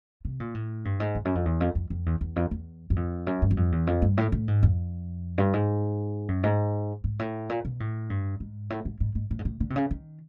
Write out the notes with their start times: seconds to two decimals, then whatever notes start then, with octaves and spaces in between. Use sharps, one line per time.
0.25 C3
0.40 A#2
0.55 A2
0.85 G2
1.00 G#2
1.15 F2
1.25 F#2
1.35 F2
1.45 E2
1.60 F2
1.75 F2
1.90 F2
2.06 E2
2.21 E2
2.36 F2
2.51 E2
2.90 F#2
2.96 F2
3.27 F#2
3.42 G2
3.51 F#2
3.57 F2
3.72 E2
3.87 F2
4.02 G2
4.17 A2
4.32 A2
4.48 G#2
4.63 F2
5.38 G2
5.53 G#2
6.28 F#2
6.43 G#2
7.04 G#2
7.19 A2
7.49 A#2
7.65 B2
7.80 A2
8.10 G2
8.40 G#2
8.70 A2
8.85 G#2
9.00 G#2
9.15 G#2
9.31 A2
9.39 G#2
9.45 A2
9.60 D3
9.70 C3
9.76 C#3
9.91 D#3